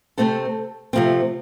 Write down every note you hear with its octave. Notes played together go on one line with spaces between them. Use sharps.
C3 F3 A3 C4 A4 C5
C3 F3 A3 C4